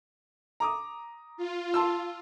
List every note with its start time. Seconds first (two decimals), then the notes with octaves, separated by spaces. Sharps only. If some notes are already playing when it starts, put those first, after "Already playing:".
0.60 A#5 D6 D#6
1.37 F4
1.74 A5 C6 E6